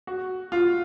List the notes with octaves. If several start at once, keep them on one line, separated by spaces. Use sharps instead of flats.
F#4
F4